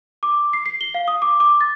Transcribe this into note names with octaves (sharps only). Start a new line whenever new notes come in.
D6
C7
C7
G7
F5
D#6
D6
D6
A6